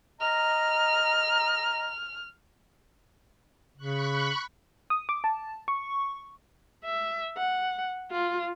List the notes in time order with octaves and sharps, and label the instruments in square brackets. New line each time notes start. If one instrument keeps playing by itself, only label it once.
[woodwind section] D#5 A#5 [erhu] F6
[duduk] C#3 [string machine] B5 C#6 F#6
[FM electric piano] D#6
D6
A5
C#6
[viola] E5
F#5
F4